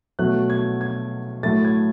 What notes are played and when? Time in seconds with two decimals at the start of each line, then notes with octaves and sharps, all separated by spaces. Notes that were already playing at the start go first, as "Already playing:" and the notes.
0.19 B2 F#3 A3 F#6
0.50 G#6
0.81 G#6
1.43 A2 F#3 A3 A6
1.65 G#6